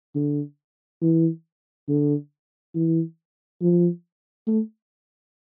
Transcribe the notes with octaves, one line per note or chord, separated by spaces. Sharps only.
D3
E3
D3
E3
F3
A3